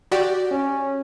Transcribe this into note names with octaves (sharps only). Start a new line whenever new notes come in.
F#4 G4 D5
C#4